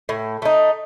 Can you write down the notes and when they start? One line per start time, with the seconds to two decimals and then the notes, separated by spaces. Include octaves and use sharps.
0.09 A2
0.42 A3 D#4